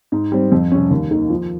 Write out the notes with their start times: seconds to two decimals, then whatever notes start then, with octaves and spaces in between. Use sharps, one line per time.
0.12 G#2
0.32 G3 C4
0.52 F2
0.72 C3 G3 C#4
0.91 D#2
1.11 D#3 A#3
1.30 F3